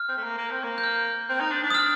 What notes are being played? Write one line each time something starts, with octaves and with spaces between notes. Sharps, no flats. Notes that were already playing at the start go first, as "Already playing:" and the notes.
Already playing: F6
C4
A3
A#3
A#3
C4
A#3
G6
F6
C4
D#4
D4
D4
D#6
F6